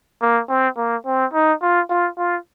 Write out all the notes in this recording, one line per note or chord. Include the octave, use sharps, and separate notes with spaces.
A#3
C4
A#3
C4
D#4
F4
F4
F4